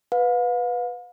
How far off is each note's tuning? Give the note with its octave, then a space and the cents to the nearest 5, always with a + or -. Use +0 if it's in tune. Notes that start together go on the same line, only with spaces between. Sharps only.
B4 +0 F5 +40